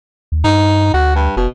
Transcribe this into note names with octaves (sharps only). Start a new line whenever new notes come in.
D#2
G2 D#4
D2 F#4
G2
F1 B2